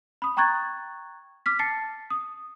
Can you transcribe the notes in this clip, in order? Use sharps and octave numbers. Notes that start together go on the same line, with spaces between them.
B5 D#6
G5 A#5 C#6 F#6 G#6 A6
D6 F6 B6
A5 A6 C7 C#7
D#6